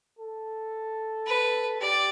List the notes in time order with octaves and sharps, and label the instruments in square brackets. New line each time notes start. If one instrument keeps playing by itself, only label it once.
[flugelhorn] A4
[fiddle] B4
[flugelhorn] G4 [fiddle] D5